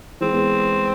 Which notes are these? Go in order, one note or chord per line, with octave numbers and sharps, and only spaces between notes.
E3 G#3 C4
G#3 B3